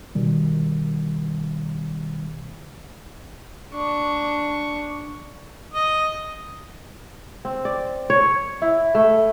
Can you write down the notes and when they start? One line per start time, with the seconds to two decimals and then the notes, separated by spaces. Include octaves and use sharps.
0.15 B2 D#3 G3
3.73 D4 C#6
5.74 D#5
7.45 C4
7.65 D5
8.10 C#5
8.62 E4
8.95 A3